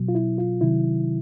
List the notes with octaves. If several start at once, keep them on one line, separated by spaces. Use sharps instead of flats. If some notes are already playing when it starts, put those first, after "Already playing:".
Already playing: B2 F#3
F4
E4
F4
C3 D#3 F#3 E4